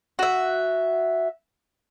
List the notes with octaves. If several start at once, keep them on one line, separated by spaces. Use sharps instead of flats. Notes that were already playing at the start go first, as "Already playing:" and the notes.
F#4 E5